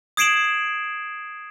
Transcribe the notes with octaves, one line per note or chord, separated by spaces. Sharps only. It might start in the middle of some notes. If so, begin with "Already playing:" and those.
D#6 G#6 C7 D7 E7 F#7